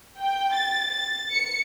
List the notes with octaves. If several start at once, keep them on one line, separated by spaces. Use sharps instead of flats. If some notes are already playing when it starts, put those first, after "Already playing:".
G5
A6
A6
C#7